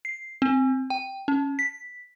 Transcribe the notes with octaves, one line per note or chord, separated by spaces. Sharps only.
C7
C4
G5
C#4
B6